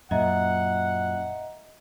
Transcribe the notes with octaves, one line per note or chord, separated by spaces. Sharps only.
F#2 A#2 D#5 E5 F#5 A#5